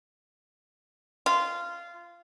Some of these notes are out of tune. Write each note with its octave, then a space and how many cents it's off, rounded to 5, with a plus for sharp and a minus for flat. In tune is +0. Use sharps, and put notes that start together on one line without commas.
F4 -15